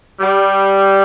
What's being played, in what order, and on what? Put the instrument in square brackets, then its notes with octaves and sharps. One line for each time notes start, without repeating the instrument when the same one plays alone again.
[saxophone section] G3